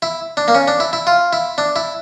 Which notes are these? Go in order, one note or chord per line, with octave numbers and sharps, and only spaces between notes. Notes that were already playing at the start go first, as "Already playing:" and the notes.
E4
D4
A#3
C#4
D4
E4
E4
F4
E4
D4
E4